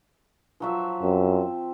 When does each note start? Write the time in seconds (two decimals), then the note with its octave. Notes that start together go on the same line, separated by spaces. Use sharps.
0.60 F3 F#3 E5
1.03 F#2 C4